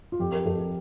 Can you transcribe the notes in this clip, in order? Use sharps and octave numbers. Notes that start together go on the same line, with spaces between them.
F4
F2 G4
A#4
F2 A4
G4